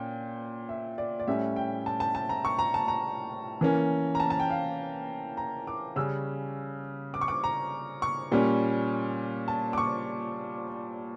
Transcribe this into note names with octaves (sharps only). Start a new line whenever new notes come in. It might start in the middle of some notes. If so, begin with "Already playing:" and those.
Already playing: A#2 C#4 G5
E5
D5
D5
A2 G3 C#4 E5
G5
A5
A5
A5
A#5
C#6
A#5
A5
A#5
E3 A#3 C#4
A#5
A5
A5
G5
F5
A#5
D6
C#3 G3 C#4 E6
D6
C#6
D6
A#5
C#6
A#2 G3 C#4
A5
D6
C#6